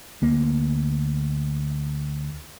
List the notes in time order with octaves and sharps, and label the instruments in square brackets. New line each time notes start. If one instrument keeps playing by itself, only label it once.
[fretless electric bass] D2 A#3